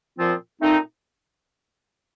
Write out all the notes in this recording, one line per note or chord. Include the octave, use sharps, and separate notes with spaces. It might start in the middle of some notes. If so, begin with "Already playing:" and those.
A#2 F3 C4 F4
A#2 A3 C4 D#4